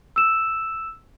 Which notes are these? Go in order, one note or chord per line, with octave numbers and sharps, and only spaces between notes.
E6 E7